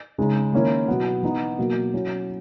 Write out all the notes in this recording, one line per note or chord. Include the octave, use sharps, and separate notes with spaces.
C#3 G#3 D#4
D#3 A#3 C#4 E4
B2 F#3 B3
E3 B3 D#4
B2 F#3 A#3
F#3 C#4 E4